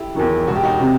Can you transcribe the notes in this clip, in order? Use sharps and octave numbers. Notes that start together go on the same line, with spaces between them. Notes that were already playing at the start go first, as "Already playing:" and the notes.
Already playing: E4 G4 A4
E2 D#3 F#3
E1 F#4
G4
D#4 F#4
C3